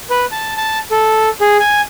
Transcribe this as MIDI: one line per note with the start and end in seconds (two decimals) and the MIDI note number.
0.10 0.26 71
0.32 0.54 81
0.57 0.79 81
0.91 1.29 69
1.41 1.57 68
1.60 1.81 80